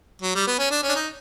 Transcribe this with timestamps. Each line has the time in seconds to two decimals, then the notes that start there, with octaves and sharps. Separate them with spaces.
0.22 F#3
0.35 G3
0.47 B3
0.59 C#4
0.71 D4
0.83 C#4
0.89 D4
0.96 D#4